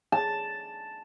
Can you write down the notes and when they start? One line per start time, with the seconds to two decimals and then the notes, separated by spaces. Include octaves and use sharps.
0.12 A5